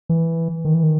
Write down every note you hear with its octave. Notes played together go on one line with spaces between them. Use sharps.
E3
D#3
E3
D#3